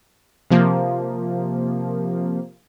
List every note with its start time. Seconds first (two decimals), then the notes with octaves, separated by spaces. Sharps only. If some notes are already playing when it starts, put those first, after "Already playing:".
0.50 C3 F3 A#3